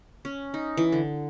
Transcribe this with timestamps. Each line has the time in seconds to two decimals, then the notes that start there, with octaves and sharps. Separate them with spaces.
0.25 C#4
0.54 D#4
0.77 E3
0.92 D3